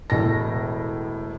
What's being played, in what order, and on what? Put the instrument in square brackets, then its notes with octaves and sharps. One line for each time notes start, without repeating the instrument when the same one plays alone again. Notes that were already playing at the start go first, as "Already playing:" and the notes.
[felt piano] E1 A2 A#6